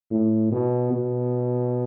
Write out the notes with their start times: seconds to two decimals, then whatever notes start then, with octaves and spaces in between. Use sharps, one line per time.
0.11 A2
0.52 B2
0.92 B2